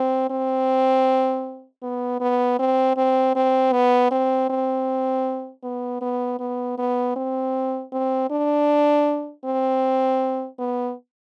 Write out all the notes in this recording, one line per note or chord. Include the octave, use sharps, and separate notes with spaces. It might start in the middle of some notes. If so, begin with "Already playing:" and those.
Already playing: C4
C4
B3
B3
C4
C4
C4
B3
C4
C4
B3
B3
B3
B3
C4
C4
D4
C4
B3